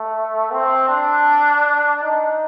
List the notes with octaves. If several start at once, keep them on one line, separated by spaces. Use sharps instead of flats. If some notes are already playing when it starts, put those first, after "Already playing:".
Already playing: A3
C4
D4
D#4